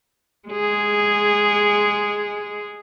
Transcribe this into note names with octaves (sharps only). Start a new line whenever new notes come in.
G#3 G#4